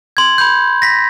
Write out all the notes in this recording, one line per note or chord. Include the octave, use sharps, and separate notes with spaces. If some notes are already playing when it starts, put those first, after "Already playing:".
C6 G#6
B5 G6
A#6 B6